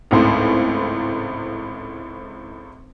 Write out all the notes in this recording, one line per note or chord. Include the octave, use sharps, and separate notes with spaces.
G#1 C#2 A2 C5